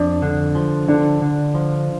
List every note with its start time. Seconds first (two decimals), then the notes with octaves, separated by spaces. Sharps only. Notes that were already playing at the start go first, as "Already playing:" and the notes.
Already playing: F2 D4
0.22 D3
0.55 F3
0.88 D3 D4
1.22 D3
1.55 F3